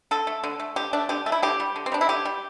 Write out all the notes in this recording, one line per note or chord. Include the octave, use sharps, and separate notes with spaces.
D3 A4
A3
D3
A3
D3 G4
A3 D4
D3 G4
A3
E4
D3 G4
G3
D3
C4
G3 D4
E4
D3 G4
G3